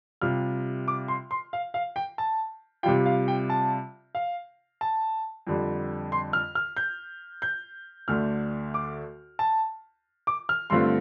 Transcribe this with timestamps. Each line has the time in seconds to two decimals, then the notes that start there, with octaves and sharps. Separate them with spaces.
0.21 C3 G3 F4 F6
0.88 D6
1.08 C6
1.31 C6
1.53 F5
1.74 F5
1.96 G5
2.18 A5
2.83 C3 G3 F4 G5
3.06 F5
3.28 G5
3.50 A5
4.15 F5
4.81 A5
5.47 F2 D3 G3
6.12 C6
6.33 F6
6.55 F6
6.77 G6
7.42 G6
8.08 D2 D3 A3 D4 F6
8.74 D6
9.39 A5
10.27 D6
10.49 F6
10.70 G2 D3 A3 C4 F4 C6